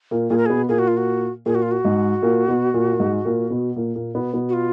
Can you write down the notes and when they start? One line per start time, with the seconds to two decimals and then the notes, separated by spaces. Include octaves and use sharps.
0.11 A#2 A#3
0.30 A#2 A#3 G#4
0.38 A#4
0.46 B2 B3 G#4
0.69 A#2 A#3 G#4
0.79 F#4
0.88 F4
0.97 F#4
1.46 A#2 A#3 G#4
1.55 F#4
1.62 F4
1.71 F#4
1.84 G#2 G#3
2.23 A#2 A#3
2.48 B2 B3
2.74 A#2 A#3
2.93 A#3
2.99 G#2 G#3
3.25 A#2 A#3
3.50 B2 B3
3.76 A#2 A#3
3.95 A#2 A#3
4.15 B2 B3
4.34 B2 B3
4.49 F#4
4.53 F4